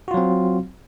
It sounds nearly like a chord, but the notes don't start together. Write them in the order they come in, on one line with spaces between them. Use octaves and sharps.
F#4 F4 F#3 C4